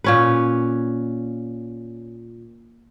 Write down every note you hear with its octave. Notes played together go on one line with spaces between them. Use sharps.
A#2 C#4 B4